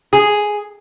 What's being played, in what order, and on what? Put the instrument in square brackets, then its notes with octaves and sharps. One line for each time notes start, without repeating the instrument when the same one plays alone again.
[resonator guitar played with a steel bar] G#4